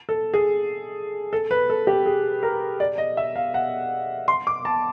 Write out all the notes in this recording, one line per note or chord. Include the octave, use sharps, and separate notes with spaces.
A4
G#4
A4
B4
A4
G4
G#4
A#4
D5
D#5
E5
F5
F#5
C6
D6
A5